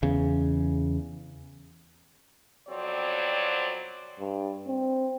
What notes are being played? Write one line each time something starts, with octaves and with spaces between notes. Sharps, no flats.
E2 C#3
F2 B2 F#3 C4 C#5 D5
G2
C4